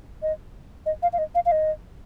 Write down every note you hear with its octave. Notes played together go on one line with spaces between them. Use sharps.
D#5
D#5
F5
F5
D#5
F5
F5
D#5